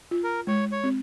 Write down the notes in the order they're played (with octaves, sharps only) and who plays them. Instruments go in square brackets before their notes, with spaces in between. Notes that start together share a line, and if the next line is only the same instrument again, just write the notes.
[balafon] F4
[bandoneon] A#4
[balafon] G#3 [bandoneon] C#5
[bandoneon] C#5
[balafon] C4